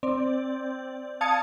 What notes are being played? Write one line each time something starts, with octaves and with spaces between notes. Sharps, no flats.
C4 D5
F5 A5 D#6 G#6 C#7